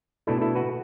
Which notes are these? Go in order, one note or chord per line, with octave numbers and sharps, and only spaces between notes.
B2 A3 D4 E4 A4
E4 A4
F#4 B4